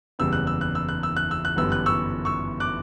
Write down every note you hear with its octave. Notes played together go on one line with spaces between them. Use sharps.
F#1 E2 C#3 G3 B3 E6
F#6
E6
F#6
E6
F#6
E6
F#6
E6
F#6
G1 F#2 E3 G3 B3 E6
F#6
C#6 E6
C#6 E6
D6 F#6